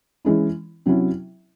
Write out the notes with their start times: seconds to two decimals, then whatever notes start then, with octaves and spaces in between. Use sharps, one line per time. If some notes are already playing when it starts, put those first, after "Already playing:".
0.25 E3 G#3 C#4 E4
0.86 C3 F#3 C#4 E4